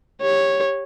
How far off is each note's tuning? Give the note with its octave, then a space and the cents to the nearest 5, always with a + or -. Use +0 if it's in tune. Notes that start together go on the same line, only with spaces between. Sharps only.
G4 +0 C#5 -10